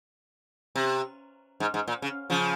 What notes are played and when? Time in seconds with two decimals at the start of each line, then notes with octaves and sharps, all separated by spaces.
0.76 C3
1.60 G#2
1.74 G#2
1.88 A#2
2.02 C#3
2.30 C#3 F3